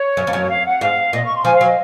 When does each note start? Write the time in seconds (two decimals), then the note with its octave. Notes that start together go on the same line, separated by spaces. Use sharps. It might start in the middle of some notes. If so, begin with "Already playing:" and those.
Already playing: C#5
0.17 F#2
0.27 F2
0.33 F#2
0.50 F5
0.66 F#5
0.81 G#2 F5
1.13 A#2 D#5
1.24 C#6
1.34 C6
1.44 F3 G#5
1.55 F5
1.61 F#3
1.65 D#5